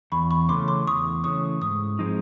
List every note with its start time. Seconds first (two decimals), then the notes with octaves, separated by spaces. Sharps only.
0.12 E2 B5 C#6
0.31 B5 C#6
0.49 C#3 E3 A3 C#4 C6 D6
0.68 C6 D6
0.87 E2 C#6 D#6
1.24 C#3 E3 A3 C#4 C#6 D#6
1.61 G#2 C#6 D#6
1.99 F3 G#3 C4 D#4